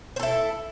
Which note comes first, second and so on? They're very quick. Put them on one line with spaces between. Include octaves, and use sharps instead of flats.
C5 A4 E4